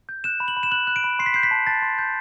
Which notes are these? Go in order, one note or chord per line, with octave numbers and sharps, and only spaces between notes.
G6
F#6 E7
B5
F#7
B5
E7
F#6 F#7
F#6
D7
B5
C6 C7
B6
G6 C7
B6
A5
A5 A6
C6
G6